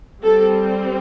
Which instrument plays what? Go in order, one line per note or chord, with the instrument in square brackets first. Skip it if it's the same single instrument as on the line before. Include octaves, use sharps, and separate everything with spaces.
[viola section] G3 C4 A4